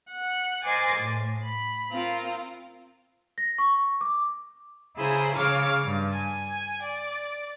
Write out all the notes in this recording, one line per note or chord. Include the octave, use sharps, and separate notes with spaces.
F#5
A#4 C5 D#5 G#5 D6 A6
A2
B5
C4 F4 A#4
A#6
C#6
D6
C#3 E4 G#4 C5 A#5
C#3 C#5 F5 D6 F6
G2
G#5
D5